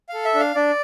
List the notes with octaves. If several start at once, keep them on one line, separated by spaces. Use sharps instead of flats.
A4 F5
E5
D4
F5
D4 D5